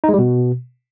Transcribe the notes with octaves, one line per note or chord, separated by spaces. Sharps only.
D#4
G#3
G3
B2